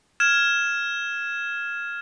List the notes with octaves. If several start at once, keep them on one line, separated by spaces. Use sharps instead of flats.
F6 G#6 E7